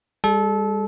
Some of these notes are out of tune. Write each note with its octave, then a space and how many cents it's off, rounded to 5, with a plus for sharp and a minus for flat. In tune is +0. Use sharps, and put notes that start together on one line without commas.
G3 +40 A4 -25